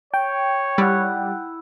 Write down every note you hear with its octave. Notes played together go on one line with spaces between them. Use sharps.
C#5 G5
G3 E4 F#5